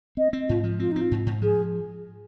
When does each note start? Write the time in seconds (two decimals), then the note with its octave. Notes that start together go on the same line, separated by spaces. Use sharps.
0.17 C4 D#5
0.33 C4
0.48 G#2 F4
0.64 F3
0.79 C4 F4
0.91 D#4
0.96 C4 F4
1.11 G#2
1.26 G#2
1.42 F3 G#4